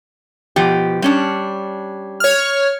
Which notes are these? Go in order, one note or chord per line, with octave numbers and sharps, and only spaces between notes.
B2 F3 G4
G3 C#4 D4
C#5 F6